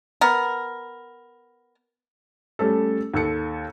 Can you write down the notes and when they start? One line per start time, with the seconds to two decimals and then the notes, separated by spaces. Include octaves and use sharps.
0.21 B3 A#4
2.59 G3 A3 C#4 A4
3.14 D#2 A4 C#7